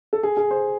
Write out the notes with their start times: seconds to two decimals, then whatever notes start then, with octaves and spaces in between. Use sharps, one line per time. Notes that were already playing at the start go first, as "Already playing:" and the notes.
0.13 A4
0.23 G#4
0.37 G#4
0.51 C5